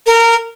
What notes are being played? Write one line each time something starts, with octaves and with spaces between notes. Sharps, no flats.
A#4